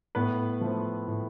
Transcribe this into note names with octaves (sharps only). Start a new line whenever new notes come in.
A2 B3 B4
F3 A3 C4
A2